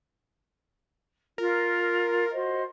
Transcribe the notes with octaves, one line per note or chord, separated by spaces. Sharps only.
F4 A#4
F#4 C5 D#5